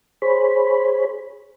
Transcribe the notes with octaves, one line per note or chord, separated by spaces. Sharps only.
G#4 C5 C#5 B5